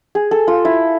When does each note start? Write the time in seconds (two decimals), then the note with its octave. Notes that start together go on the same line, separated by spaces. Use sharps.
0.15 G#4
0.31 A4
0.48 F4
0.65 E4